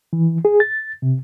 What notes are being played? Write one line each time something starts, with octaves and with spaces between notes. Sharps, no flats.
E3
G#4
A6
C3